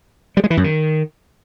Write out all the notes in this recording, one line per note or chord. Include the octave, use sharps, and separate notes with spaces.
G3
G#3
E3
F#2
D#3